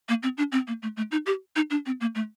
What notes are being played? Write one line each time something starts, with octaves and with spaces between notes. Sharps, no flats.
A#3
C4
D4
C4
A#3
A3
A3
D#4
G4
D#4
D4
C4
A#3
A3